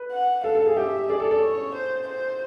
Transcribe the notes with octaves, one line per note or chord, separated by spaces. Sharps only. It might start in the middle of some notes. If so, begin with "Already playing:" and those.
Already playing: B4
F#5
A4 F5
A4
G#4
G4 E5
G#4 D5
A4
A4
C#5
C5
C5